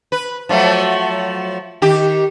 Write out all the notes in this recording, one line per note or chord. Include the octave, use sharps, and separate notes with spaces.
B4
F3 F#3 A3
D#3 G4